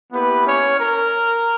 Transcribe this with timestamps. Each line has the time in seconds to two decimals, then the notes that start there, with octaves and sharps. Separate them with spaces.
0.12 A#3 B3 E4 G4 B4
0.46 C#4 C#5
0.80 A#4